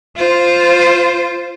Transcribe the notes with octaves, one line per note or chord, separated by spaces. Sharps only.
F4 C5